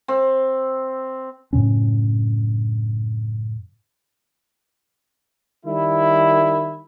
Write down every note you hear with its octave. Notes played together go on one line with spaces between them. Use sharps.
C4
F#2 A2 C#3 C#4
D#3 G3 E4